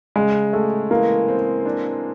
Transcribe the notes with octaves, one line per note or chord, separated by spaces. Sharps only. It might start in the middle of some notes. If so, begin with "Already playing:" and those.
C#3 G#3
G#3 A3
E3 A#3
C4
D4